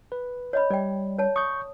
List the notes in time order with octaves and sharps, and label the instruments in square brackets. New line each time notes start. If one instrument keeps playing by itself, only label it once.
[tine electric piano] B4
[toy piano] C#5 D#5 B5
[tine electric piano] G3 [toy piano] D5 G5
[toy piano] C#5 A5
[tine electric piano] C#6 G6 [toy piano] D#6